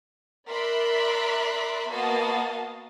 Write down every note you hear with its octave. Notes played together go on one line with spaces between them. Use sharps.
A#4 D5 E5 B5 C6 F#6
A#3 B3 F#4 D#5 F5 A5